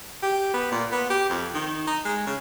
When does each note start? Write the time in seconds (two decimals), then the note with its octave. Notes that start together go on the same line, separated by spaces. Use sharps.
0.22 G4
0.54 B3
0.72 A#2
0.92 B3
1.10 G4
1.30 F2
1.55 D#3
1.87 D#4
2.05 G#3
2.27 C#3